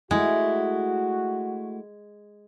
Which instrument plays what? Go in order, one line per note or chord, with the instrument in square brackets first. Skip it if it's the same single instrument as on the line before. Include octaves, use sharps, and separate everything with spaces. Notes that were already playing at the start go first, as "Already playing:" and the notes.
[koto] G#3 [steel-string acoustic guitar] A3 E4 [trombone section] F#4